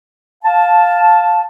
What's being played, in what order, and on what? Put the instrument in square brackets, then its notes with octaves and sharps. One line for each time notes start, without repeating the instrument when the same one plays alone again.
[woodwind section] F5 A5